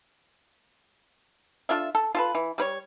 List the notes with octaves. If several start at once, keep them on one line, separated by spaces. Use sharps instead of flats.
D4 F4 A4 E5
A4
F4 A4 B4
E3
G3 B4 C#5